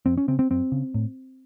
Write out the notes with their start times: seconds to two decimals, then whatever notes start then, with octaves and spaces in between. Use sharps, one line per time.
0.06 F2 C4
0.18 C#4
0.28 C#3 C4
0.39 C4
0.50 F#2 C4
0.72 C#3
0.94 A2